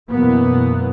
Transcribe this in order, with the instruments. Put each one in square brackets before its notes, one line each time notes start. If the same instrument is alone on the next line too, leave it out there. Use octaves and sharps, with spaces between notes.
[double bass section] F#2 B2 E3 A#3 B3